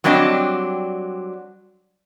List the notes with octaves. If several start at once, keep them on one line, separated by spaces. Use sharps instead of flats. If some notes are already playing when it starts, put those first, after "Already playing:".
F#3 G3 C4 D4 D#5